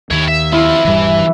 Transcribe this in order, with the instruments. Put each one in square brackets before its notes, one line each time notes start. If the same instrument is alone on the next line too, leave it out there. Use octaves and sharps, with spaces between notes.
[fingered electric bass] D#2 D#3 [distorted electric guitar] E4 C#5
[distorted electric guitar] E5
[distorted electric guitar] C4 F4 [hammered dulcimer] E4
[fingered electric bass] D#1 G2 G3 [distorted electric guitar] E3